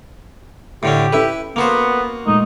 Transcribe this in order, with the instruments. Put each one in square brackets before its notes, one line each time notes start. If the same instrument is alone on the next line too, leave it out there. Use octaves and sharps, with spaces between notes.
[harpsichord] A2 D3 C#4 [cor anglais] G4
[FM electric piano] C#4 A4 [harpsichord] E4 B4
[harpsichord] A#3 F#4 C5 [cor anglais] B3
[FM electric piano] A#2 G#3 A3 [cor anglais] D#4